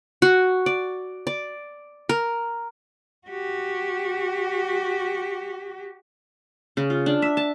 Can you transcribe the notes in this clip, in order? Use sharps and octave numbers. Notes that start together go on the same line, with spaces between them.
F#4
D5
D5
A#4
F#4 G4
C#3
F4
D4
E5
A5